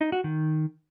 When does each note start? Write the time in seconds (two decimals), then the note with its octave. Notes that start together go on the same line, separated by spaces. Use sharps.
0.01 D#4
0.12 F#4
0.24 D#3